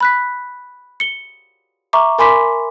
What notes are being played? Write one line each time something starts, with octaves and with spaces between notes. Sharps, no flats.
B5 F#6 B6
C#7 G7
E5 A#5 C#6 D6
A#4 G#5 B5 C6 D6 B6